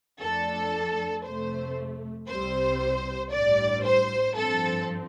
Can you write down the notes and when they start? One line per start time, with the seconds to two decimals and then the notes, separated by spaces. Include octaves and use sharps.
0.20 F2 F3 A3 D4 A4
1.24 F2 C3 A3 C5
2.28 C2 C3 G3 C4 C5
3.32 A1 G2 G3 D5
3.84 C5
4.36 G2 F3 C4 A4